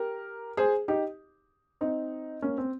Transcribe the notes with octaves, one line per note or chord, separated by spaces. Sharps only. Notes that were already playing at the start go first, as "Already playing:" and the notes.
Already playing: G4 A#4
G#4 C5
D#4 G4
C4 D#4
A#3 C#4
C4